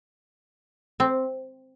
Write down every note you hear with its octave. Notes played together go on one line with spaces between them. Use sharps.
C4